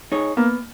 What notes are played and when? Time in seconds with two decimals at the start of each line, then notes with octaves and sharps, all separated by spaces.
0.12 D#4 G#4 C#5
0.37 A#3 B3